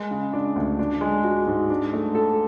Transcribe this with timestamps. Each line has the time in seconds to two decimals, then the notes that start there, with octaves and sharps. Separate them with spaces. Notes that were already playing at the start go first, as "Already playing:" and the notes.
Already playing: G#3
0.11 C#3
0.33 D4
0.56 D2
0.79 D4
1.01 G#3
1.24 F#4
1.47 G#2
1.70 D4
1.93 A3
2.15 A4